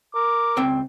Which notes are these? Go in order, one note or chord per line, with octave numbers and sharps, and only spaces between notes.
A#4 D6
C#2 C4 G5